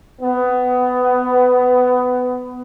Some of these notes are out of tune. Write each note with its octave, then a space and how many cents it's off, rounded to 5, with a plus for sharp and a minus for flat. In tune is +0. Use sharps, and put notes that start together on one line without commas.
B3 +20